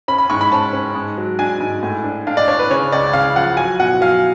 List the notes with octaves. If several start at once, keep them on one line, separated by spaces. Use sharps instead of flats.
C#4 B5
B5
G#2 C#6
B5
C#4 A5
C#4
G#2
F#3
D4 G#5
G#2
A2
D4
D4 F5
D5
D4 C#5
B4
C#3 C#5
C#2 D5
C#3 F5
F3 F#5
F#3 G#5
B2 F#5
F#3 F5